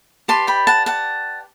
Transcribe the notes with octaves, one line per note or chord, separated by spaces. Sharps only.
G4 B4 D5 A5 C6
G5 B5
F#5 A5
F#5 A5